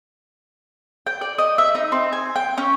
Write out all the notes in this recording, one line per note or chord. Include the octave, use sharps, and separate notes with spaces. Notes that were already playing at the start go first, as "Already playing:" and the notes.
G5
D5
D#5
E5
D#4
C4
G#5
G5
C#4